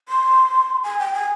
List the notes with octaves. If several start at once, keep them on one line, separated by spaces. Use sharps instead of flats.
C6
G#5
G5
G#5